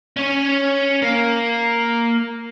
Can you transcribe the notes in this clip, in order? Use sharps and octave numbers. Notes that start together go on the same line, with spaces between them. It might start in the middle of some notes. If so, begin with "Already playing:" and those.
C#4 C#5
A#3